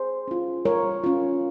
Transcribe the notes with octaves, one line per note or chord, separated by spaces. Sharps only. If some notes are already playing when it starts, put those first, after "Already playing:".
Already playing: G#4 C5
C#4 F4
G3 A#4 C#5
C#4 F4